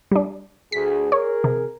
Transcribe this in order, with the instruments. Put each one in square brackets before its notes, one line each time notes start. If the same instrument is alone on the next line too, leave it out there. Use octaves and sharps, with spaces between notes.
[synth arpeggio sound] G3 D4
[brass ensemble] D2 G#4 [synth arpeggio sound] B6
[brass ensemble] G#4 A#4 [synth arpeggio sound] C#5
[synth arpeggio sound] C3